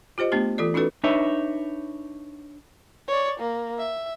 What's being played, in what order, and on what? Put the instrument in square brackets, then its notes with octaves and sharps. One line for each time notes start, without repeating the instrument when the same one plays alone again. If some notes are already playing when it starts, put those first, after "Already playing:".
[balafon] F4 G4 C5 D#5
A3 B3 D4 G4
E3 F4 A4 D5
C#4 D#4 E4 F#4 A4 B4
[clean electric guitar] D4 D#4 B4 C#5 E5
[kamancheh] C#5 D5
A#3
E5